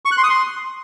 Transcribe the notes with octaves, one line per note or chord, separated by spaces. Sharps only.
C#6
F#6
C6
D#6
C6